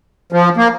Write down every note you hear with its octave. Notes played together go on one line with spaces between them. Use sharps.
F3
A#3